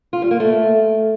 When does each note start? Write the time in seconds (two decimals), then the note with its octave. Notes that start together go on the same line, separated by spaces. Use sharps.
0.13 F4
0.22 G3
0.31 A#3
0.40 A3